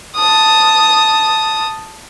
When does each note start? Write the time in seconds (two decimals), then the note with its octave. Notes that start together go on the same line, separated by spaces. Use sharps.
0.15 A5 D#6